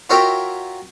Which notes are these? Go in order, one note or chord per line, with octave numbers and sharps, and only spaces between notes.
F4 F#4 A#4 C#5 E5 G5